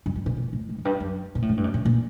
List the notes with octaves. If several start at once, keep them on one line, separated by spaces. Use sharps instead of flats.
G2
G#2
A#2
B2
A2
G#2
F#2
G2
F#2
A#2
A2
G#2
G2
F#2
A2
A#2